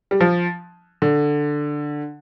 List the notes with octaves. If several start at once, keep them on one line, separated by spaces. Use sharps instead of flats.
G3
F3
D3